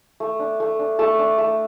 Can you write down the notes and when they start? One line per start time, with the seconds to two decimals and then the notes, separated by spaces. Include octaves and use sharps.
0.20 A3
0.40 D4
0.60 A3
0.79 D4
0.99 A3 A4 A5
1.19 D4
1.38 A3